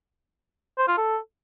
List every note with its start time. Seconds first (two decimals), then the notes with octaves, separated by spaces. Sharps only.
0.78 C5
0.88 F4
0.98 A4